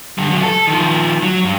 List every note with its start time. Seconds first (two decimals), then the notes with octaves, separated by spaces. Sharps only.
0.18 D3 G3
0.31 C#2 F#3
0.43 A4
0.67 D#3 F3
1.22 F#3
1.45 G2